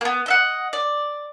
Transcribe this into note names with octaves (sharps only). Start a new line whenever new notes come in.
A#3 B3
D#5 E5 F#5
D5